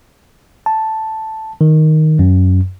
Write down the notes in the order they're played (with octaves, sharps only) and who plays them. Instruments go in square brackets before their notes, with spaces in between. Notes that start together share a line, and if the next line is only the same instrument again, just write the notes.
[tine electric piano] A5
D#3
F#2